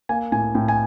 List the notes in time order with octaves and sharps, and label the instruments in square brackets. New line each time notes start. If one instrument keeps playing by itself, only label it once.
[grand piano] A#3 G#5
A2 G#5
A2 G5
G#5